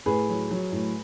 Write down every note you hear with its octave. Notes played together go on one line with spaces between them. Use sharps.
A2 G#4 B4
F#3
F#3
A2